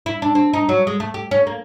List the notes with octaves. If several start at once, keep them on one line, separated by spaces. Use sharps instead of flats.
E4
D4
C4
D#4
F#3
G#3
A3
G4
C#4
A#3